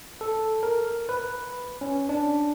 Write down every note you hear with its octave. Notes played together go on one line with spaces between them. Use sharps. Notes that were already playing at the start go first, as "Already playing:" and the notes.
A4
A#4
B4
C#4
D4